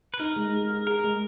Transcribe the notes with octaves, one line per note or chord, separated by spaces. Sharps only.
B4
D#4 A#4
G#3
G#4
G#4
G#4 A#4
G#3